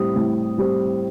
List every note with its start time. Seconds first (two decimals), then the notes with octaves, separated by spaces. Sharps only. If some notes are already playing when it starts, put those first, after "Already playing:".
Already playing: A2 G3 C4 D#6
0.16 A2
0.58 G3 C4